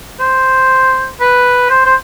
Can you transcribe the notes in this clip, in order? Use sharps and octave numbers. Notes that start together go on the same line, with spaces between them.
C5
B4
C5
C5